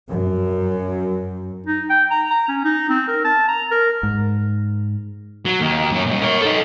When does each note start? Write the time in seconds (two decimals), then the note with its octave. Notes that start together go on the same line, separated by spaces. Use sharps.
0.10 F#2
1.67 D#4
1.90 G5
2.11 A#5
2.30 A#5
2.48 C#4
2.64 D#4
2.89 C4
3.08 A#4
3.25 A5
3.49 A#5
3.71 A#4
4.03 G#2
5.45 F#3
5.60 D#2
5.92 F#2 C#5
6.07 A#2 G3
6.22 A#4 C#5
6.41 D#4 A4